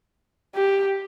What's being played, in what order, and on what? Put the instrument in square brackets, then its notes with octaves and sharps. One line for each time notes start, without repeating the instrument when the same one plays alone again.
[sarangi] G4